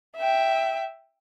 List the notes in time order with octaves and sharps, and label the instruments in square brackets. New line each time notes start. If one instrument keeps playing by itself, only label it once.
[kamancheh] E5 G5